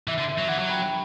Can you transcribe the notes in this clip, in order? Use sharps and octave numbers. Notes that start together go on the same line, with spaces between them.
E3 E5
D3
E5
F#3
E3 F#5
F#3
G5 B5